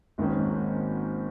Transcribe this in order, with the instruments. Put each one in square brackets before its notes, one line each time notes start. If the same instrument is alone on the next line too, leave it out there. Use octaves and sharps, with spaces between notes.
[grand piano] G#1 G#2 D#3 A#3 C#4